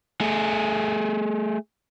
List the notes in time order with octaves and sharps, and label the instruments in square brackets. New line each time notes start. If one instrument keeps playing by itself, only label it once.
[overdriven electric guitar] A3 G#4